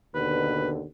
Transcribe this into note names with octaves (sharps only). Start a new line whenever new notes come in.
D#2 B2 D3 B4